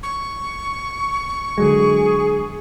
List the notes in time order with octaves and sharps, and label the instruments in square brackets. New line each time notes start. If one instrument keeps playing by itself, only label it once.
[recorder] C#6
[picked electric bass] D3 F#3 G#3 [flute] G#4